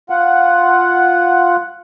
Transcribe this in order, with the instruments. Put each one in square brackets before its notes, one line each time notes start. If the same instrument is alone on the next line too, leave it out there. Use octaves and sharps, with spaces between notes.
[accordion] F4 F#5